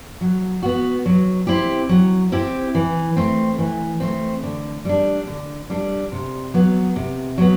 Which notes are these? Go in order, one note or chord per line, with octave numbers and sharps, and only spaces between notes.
F#3
B3 F#4
F#3
C4 E4 G4
F#3
C4 E4 G4
E3
A3 C4
E3
A3 C4
D3
G3 D4
D3
G3 D4
C3
F#3 B3
C3
F#3 B3